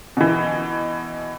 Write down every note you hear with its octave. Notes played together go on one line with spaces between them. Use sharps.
B2 E3